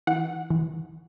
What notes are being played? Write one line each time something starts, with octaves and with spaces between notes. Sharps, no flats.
E3 F#5
E3